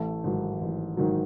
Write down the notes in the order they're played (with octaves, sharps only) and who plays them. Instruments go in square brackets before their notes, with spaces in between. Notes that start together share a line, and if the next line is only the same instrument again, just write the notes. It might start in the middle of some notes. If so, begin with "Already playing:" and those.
Already playing: [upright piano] A1 A3 A4
G#2 D#3 F#3
A1
G#2 D#3 F#3